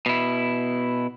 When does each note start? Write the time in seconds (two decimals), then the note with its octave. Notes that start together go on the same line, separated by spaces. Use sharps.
0.06 B2 E4